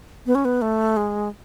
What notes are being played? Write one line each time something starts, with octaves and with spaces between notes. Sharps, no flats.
B3
C#4
B3
A3
G#3